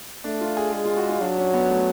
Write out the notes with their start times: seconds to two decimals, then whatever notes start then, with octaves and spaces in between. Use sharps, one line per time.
0.24 A3 D4
0.41 F4
0.57 G#4
0.73 G#3 G#4
0.85 F4
0.97 F#4
1.09 F4
1.21 F#3 D4
1.38 C#4
1.54 B3
1.70 A3